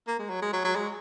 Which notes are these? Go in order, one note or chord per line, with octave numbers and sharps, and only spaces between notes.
A#3
G#3
F#3
G#3
F#3
F#3
G#3